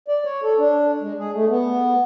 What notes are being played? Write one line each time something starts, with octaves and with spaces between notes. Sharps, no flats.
D5
C#5
A4
D4
G#3
G#4
A3
B3